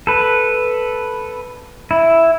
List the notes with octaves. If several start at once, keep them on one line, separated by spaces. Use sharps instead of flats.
A4 B4
E4